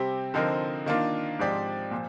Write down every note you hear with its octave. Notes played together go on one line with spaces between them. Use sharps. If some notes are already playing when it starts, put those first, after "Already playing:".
Already playing: C3 G3 C4 G4
D3 F3 C4 D#4 A#4
D#3 A#3 D4 F4
G#2 F3 C4 G4 D5
A#2 F3